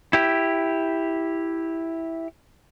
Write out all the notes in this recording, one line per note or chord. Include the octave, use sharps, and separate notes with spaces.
E4 G4